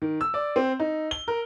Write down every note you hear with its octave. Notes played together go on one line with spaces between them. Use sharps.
D#3
E6
D5
C4
D#4
G7
A#4